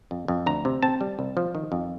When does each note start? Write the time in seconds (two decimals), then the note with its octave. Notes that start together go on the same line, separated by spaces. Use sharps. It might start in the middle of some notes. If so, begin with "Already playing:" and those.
0.11 F2
0.28 F2
0.46 D2 A#5
0.65 C3
0.83 C4 A5
1.01 G3
1.19 C2
1.37 F3
1.55 D#3
1.72 F2